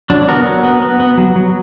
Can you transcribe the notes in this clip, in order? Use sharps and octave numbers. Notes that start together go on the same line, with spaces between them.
F#3 D4
B3 F#4 A#4
F#3
B3
B3
B3
F#3
F#3